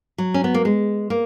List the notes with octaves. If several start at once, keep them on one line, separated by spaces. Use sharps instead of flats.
F#3
C#4
B3
A#3
G#3
A#3